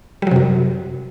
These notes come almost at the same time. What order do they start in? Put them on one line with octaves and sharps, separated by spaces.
G3 F#3 C3 F#2